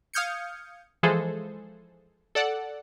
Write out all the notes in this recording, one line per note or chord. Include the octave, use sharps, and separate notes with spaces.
F5 D#6 F6 G6 G#6 C#7
E3 F3 G#3 G#4 A4 C5
A4 D5 F#5